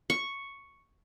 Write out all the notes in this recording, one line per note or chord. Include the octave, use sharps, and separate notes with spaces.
C#6